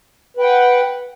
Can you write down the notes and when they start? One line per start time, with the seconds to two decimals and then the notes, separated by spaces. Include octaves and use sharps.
0.37 B4
0.40 G5
0.43 F#5